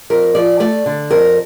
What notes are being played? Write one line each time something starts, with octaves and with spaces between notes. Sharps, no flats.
F2 A#4
F3 D5
A3 D5
D3
F2 A#4